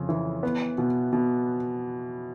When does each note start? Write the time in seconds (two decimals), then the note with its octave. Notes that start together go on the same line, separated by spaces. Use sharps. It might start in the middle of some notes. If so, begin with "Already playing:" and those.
Already playing: F2 C#3
0.09 E3
0.43 B3
0.78 B2
1.13 B2